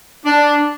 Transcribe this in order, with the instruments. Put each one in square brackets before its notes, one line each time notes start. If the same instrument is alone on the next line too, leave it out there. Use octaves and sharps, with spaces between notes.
[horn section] D4